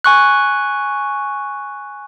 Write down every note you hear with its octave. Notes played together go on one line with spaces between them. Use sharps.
G#5 C#6 F#6